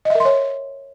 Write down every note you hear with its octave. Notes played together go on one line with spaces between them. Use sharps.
A#4 C#5 D#5 E5 C6